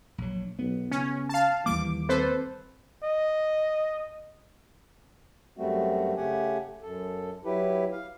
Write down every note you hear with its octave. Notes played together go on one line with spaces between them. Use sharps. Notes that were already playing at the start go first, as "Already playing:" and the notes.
A#1 F#3
B1 B3
C#3 C#4
F5 A5
D#2 E3 G3 A#3 D6
C4 A4 B4 C5
D#5
F#2 G3 A3 C4 F#4
C#3 A3 G4 F#5 G#5
F#2 A4
F#3 E4 G4 B4
F5